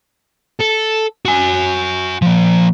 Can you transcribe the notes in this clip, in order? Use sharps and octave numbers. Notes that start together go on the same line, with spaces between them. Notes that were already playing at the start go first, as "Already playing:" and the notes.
A4
F#4 G#5
F3 A#3